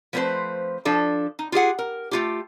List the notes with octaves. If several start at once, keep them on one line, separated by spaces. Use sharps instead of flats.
F3 A3 B3 C4 B4 C5
F3 D4 A4
D#4
F4 G4 G#4 F#5
A#4
A3 F4 G4